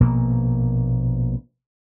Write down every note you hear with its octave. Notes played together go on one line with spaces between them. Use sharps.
A#1 B2 A#3